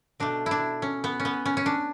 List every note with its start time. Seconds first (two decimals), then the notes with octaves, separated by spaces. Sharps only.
0.20 B2 A3 D4
0.46 D4 E4
0.82 C#4
1.04 B3
1.20 C#4
1.25 B3
1.46 C#4
1.57 C#4
1.66 D4